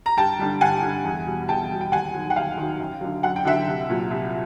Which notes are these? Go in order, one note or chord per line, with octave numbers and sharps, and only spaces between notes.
A#5
G2 G5 A5
D3 G3
G2 F#5 G#5
D3 G3
E2
B2 G3
E2 G5 A5
B2 G3
G5
D#2 F#5 G#5
D#3 F#3
F#5
D#2 F5 G5
D#3 F#3
F#2
D3 F#3
F#2 F#5
G5
D3 F#3 E5 F#5
C2
A#2 F#3
C2